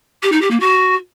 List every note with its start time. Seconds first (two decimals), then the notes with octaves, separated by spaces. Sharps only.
0.22 G4
0.32 D#4
0.41 G4
0.50 A#3
0.60 F#4